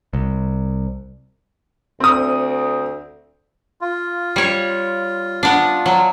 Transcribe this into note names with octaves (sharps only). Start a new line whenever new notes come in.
C2
D2 C4 D#6
F4
G3 C#5
B3 D4
F#3